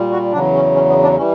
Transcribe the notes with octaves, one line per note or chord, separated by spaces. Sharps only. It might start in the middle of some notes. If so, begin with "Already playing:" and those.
Already playing: A#2 G3
F#4
E2 C#3 F#3 D4
C#4
C#4
B3
D4
E3 G3 C#4